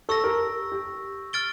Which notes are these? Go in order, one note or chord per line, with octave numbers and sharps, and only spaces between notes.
A4 C#6 E6 A#6
G4 A#4
G4
F6 A6 D7 G7